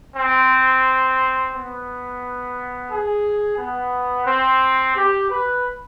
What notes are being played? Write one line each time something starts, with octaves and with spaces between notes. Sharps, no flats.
C4
B3
G#4
B3
C4
G4
B4